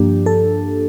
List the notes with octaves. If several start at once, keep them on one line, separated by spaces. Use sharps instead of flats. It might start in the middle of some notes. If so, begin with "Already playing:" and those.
Already playing: G2 F3 A#3 D4 G4
A4